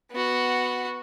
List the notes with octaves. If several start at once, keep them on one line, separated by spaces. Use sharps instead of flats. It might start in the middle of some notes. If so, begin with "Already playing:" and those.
B3 F#4